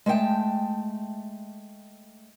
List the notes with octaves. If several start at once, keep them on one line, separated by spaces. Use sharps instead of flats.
G#3 A3 E5 G5 A5